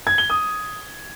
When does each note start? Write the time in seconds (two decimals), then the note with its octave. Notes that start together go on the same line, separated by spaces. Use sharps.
0.07 G#6
0.18 G7
0.30 D#6